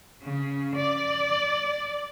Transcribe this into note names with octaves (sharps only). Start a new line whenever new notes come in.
C#3
D5